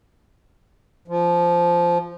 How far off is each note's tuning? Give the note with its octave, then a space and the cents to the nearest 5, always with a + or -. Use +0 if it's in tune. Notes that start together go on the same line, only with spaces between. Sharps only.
F3 -10